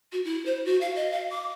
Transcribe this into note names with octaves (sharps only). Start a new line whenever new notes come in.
F#4
E4
C5
F#4
F5
D#5
F5
D6